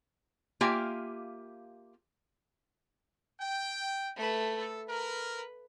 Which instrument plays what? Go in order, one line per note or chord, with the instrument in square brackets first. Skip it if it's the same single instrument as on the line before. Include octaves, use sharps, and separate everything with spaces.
[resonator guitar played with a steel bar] A#3 F4 G4 E5 G5 G#5
[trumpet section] G5
[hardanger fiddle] A3 B4
[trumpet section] A4
[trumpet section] A#4 [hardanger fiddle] B4